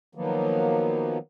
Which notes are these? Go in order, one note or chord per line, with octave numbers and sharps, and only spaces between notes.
D#3 F3 F#3 A#3 B3